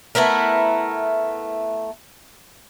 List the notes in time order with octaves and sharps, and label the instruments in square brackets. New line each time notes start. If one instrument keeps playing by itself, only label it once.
[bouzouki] A3 B3 E4 A#4